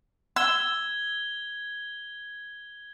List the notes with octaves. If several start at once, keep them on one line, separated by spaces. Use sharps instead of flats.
E6 G#6 G7